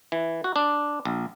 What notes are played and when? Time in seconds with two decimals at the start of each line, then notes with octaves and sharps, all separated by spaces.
0.12 E3
0.44 F#4
0.56 D4
1.05 A#1